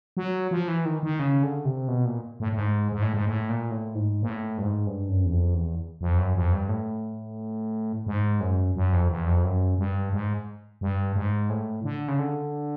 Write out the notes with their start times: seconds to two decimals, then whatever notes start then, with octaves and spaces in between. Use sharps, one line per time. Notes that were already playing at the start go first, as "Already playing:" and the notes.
0.17 F#3
0.51 F3
0.68 E3
0.85 D#3
1.03 D#3
1.19 C#3
1.43 D3
1.65 C3
1.88 B2
2.05 A#2
2.40 A2
2.52 A2
2.58 G#2
2.92 G#2
3.02 A2
3.14 G#2
3.27 A2
3.49 A#2
3.71 A2
3.95 G#2
4.22 A#2
4.29 A2
4.58 G2
4.63 G#2
4.87 G2
5.09 F#2
5.25 E2
5.31 F2
5.54 E2
6.01 F2
6.18 F#2
6.35 F2
6.53 G2
6.69 A2
8.06 G#2
8.40 F#2
8.75 F#2
8.93 F2
9.09 E2
9.26 F2
9.44 F#2
9.78 G2
10.13 G#2
10.81 G2
11.16 G#2
11.50 A2
11.84 D3
12.08 C#3
12.19 D3